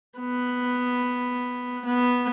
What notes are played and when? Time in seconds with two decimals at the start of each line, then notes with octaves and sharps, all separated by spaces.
0.20 B3
1.85 B3